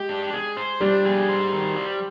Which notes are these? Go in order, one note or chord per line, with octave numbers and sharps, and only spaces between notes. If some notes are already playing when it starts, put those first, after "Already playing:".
Already playing: G#3 G4
D4
G#4
C5
G3 D4
G#4
C5
D#3
G3